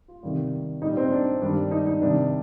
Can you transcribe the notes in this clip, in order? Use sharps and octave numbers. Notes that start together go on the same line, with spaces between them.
F4
C3 D#3 G3
A#2 G3 D#4
C4
D4
G2 D#3 G3 D4
D#4
D#4
C3 D#3 G3 D4